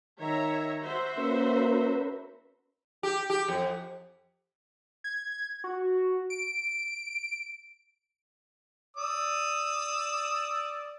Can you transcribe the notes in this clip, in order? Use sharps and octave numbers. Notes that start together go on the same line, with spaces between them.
D#3 C#5 E5 A#5
F#4 C5 E5
A#3 C#4 A#4 B4
G4
G4
F2
G#6
F#4
D7
D5 D#6 E6